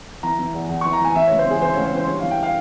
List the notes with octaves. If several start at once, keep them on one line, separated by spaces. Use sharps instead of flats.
E3 A#5
E3
E2
E2
E3 C#6
A#5
E3 G#5
E3 E5
C#2 C#5
C5
E3 G#4
E3 C5
C#5
C#2
C#5
E3 C5
G2 C#5
E3 F5
G5
F5